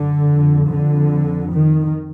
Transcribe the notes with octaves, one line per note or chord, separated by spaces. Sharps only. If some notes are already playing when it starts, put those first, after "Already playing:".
Already playing: F#2 D3
F2
D3
D#3